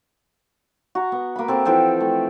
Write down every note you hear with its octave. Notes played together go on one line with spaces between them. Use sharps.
F#4 A#5
B3
A#3 B5
C4 A4
E3 F3 A4 G5
A3